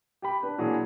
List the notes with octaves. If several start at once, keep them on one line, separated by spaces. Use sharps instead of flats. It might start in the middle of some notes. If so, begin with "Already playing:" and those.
G4 G5 B5
D4 B4
A#2 E3 F#3 D4 G#4